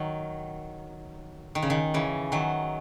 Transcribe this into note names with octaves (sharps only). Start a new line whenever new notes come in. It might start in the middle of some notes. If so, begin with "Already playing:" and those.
Already playing: D#3 F#3
D#3
C#3
D#3
C#3 E3
D#3 F#3